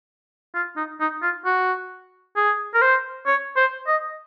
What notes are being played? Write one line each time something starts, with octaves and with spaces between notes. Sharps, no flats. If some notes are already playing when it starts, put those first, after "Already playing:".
F4
D#4
D#4
F4
F#4
G#4
A#4
C5
C#5
C5
D#5